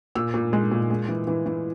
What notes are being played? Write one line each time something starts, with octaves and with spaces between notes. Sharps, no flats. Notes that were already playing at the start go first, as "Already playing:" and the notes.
A#2 E6
A#2
G#3
A#2
G#3
E3
E3
E3